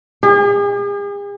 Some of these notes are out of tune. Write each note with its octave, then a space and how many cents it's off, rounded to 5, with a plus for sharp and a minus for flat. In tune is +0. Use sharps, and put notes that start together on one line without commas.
G#4 -45